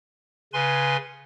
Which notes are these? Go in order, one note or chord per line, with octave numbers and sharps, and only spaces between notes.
C#3 B4 G#5 C6